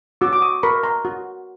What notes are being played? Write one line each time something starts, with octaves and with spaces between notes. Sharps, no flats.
F#4 D6 E6
D6
C#6 D#6
A#4 B5 C#6
A#5 C6
F#4